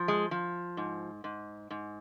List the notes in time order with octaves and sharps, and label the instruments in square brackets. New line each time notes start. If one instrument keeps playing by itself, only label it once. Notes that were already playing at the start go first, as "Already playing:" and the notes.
Already playing: [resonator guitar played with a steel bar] F3
G#3
F3
G#2
G#2
G#2